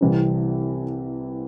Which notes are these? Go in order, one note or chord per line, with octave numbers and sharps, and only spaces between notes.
C2 C3 E3 G3 C4